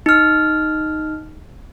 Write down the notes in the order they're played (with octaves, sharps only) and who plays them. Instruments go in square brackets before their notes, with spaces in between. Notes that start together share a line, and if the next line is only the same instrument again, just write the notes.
[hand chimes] D#4 F6